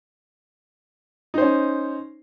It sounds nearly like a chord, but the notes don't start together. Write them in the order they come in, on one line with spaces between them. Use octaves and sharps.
D#4 C5 C#4